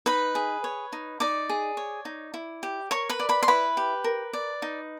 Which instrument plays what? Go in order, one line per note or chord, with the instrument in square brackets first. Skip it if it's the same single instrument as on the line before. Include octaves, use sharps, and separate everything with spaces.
[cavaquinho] D#4 B4 B5
G#4
C#5
D#4
D#4 D5 D6
G#4
C#5
D#4
E4
G4
A#4 C#5 C#6
B4 B5
D5
B4 B5
C6
E4 B4 B5
G4
A#4
D5
D#4